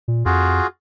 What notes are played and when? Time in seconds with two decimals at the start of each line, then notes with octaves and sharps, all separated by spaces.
0.08 A#2
0.26 F2 F4 F#4 G#4